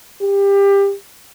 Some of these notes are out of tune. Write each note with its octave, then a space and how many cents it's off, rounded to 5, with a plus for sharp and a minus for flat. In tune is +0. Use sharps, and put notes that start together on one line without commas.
G4 +25